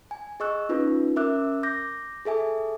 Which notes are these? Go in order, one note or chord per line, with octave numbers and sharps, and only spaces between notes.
G#5
G#4 D#5 C#6 E6 F#6
C#4 D#4 F4 B4
C#4 A#4 E5 D6 E6 F#6
D6 G6 A#6
G#4 A4 E5 G#5